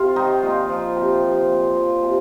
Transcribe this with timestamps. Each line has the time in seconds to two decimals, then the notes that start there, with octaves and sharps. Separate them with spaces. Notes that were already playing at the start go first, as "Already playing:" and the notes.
Already playing: C3 F4
0.16 D#3 D#4
0.43 A#2 F4
0.69 F3
0.96 C3
1.23 F3
1.49 A#2
1.76 F3
2.03 C3